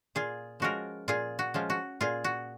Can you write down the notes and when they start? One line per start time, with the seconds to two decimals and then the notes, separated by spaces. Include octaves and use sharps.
0.15 A#2 F4 G#4
0.60 F3 G#3 C#4 F4 F#4 A#4
1.08 A#2 F4 G#4
1.39 F#4
1.54 F3 G#3 C#4 F4
1.70 F#4
2.01 A#2 F4 G#4
2.24 F#4